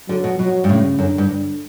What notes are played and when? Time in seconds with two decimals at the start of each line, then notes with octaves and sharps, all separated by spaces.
0.09 D3 F#3
0.24 B2
0.39 B2 F#3
0.64 G2
0.69 A2 C#3
0.99 F#2 D3
1.18 G2